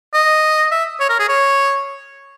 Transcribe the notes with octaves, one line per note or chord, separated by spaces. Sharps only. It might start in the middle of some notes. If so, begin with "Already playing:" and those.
D#5
E5
C#5
A#4
G#4
C#5